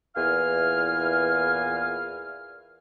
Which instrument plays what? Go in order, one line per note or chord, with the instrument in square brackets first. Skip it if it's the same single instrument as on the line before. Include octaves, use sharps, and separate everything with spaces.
[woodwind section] E2 A#2 E3 F5 G#5 F6